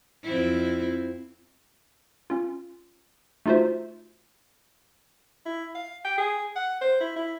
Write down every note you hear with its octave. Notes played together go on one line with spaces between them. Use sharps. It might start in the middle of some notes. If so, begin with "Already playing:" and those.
F2 C4 E4
C#4 F4
A3 D#4 F4 F#4 C5 E5
E4
F5
G5
G#4
F#5
C5
E4
E4